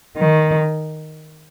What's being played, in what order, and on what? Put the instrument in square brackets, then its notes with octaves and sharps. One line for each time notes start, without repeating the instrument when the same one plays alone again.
[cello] D#3